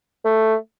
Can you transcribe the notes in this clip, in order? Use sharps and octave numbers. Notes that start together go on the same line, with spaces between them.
A3